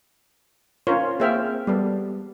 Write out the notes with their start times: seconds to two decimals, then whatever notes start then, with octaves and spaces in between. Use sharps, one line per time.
0.87 C#4 F4 A#4 C5 C#5
1.20 A#3 C4 G#4 E5 G5 F6
1.67 G3 B3 A4